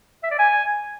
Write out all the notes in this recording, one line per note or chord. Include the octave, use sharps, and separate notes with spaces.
E5
D5
G#5